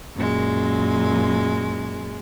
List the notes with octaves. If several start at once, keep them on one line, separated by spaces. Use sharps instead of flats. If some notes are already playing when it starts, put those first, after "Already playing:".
F#2 A#2 G#3